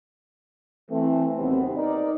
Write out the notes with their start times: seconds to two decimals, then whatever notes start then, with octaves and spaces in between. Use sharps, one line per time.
0.90 E3 A3 C4
1.38 D#2 C3 D#3 F#3 B3 C4
1.78 D#4 A#4 D5